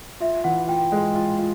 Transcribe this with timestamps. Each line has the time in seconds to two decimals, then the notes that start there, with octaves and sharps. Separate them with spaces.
0.20 F4 E5
0.44 E3 F#5
0.68 F4 G5
0.92 G#3
1.15 F4
1.39 F4